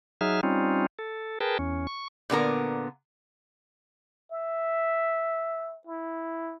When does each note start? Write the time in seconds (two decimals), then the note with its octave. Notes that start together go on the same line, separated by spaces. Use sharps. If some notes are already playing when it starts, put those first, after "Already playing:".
0.21 F#3 D#4 G#4 E5 F6
0.43 G3 C4 C#4 D#4 F4
0.99 A4
1.40 G#4 A#4 B4 G5 A5
1.59 E2 C#4
1.87 C#6
2.30 A#2 D3 B3 A#4
4.31 E5
5.87 E4